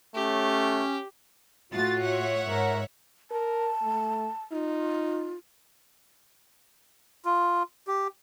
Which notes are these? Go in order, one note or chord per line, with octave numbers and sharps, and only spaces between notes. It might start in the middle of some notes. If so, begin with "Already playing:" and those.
A3 C#4 G4
A2 F4 F#4 A6
C#5 E5 F#5
G#2 A#4
A#4 A5
A3
D#4 F4
F4
G4